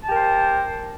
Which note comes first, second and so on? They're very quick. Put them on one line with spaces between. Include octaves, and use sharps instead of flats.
A5 G4 A#4 C5